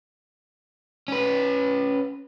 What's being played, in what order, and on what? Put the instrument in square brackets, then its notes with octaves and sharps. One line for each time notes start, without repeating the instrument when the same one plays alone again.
[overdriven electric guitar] C#4 B4